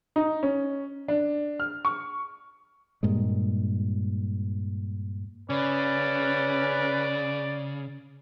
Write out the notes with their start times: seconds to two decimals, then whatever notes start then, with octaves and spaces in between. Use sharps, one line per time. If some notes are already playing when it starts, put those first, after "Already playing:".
0.16 D#4
0.43 C#4
1.08 D4
1.60 F6
1.85 C#6
3.03 G2 A#2 G#3
5.50 C#3 C#4 B4 D5